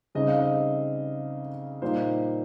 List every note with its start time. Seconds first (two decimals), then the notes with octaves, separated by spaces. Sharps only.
0.15 C#3 G3 C4 D#4 D#5
0.28 F5
0.41 D#5
1.82 A#2 G3 A#3 D#4 C5